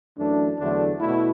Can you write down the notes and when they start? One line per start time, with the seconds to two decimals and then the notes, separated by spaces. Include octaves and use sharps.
0.17 F#2 E3 A3 D4
0.58 E2 D3 F#3 A3 D4
1.00 B2 A3 E4